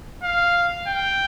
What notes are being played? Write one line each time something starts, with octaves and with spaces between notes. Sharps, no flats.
F5
G5